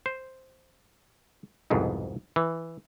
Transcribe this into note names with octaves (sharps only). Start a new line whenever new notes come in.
C5
C2 F2 G#2 B2
E3